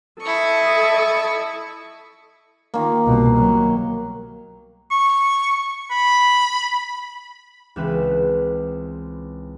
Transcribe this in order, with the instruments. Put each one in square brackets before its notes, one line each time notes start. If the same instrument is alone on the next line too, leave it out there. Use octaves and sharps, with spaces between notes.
[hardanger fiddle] E4 C#6 [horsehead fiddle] A4 D#5
[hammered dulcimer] D#3 A#3
[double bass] C2 B2
F#3
[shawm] C#6
B5
[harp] C#2 E3 C4 E4 B4